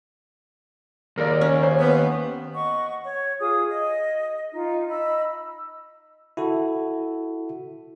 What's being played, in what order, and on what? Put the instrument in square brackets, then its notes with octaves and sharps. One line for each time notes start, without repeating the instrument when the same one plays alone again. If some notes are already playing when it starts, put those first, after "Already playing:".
[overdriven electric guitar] D#2 [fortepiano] A#4 D5
[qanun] C#4
[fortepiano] C5
[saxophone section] B3
[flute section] D#5 F#5 C#6
C#5
F4 G#4 D#6
D#5
D#4 F4
D#5 B5 E6
[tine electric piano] E4 F#4 A4